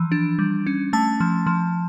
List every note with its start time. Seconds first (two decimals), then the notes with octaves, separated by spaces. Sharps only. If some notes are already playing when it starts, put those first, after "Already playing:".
Already playing: E3 F3
0.12 D4
0.39 G3
0.66 C#4
0.93 A3 A5
1.20 F3
1.46 F3